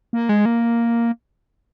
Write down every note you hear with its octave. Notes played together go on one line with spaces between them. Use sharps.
A#3
G#3
A#3